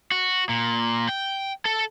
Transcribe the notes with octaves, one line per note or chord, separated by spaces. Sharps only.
F#4
A#2
G5
A4